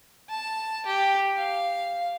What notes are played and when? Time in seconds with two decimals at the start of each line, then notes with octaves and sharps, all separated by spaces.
0.30 A5
0.86 G4
1.37 F5